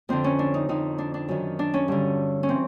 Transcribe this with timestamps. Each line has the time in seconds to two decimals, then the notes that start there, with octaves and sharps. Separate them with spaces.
0.09 F2 D3 C4
0.24 C#4
0.39 D4
0.54 D#4
0.69 F2 D3 D#4
0.98 D4
1.14 D4
1.28 F#2 D#3
1.59 D4
1.74 C#4
1.88 G2 D3
2.43 C#4
2.48 E3 C4